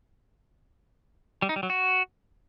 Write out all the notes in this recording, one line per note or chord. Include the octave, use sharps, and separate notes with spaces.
G3
D#4
G3
F#3
F#4